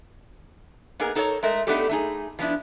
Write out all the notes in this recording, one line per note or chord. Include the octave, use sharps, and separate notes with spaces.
A#3 B3 D#4 G#4 A#4
D#4 A4 A#4 C5 C#5
G#3 A3 A#4 E5
A3 B3 D4 D#4 G4 A4
A3 D#4 G#4
F3 B3 D4 E4